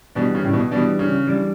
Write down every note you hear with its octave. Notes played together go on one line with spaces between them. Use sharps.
B2 E3 G3 D4
C#3
A2
B2
B2 E3 G3 D4
C#3
E3 G3 D4